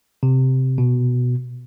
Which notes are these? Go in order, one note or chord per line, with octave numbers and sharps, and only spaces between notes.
C3
B2